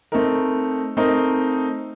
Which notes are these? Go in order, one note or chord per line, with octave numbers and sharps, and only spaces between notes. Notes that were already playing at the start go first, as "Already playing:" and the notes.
A3 C4 D#4 A#4
A3 C4 D#4 A#4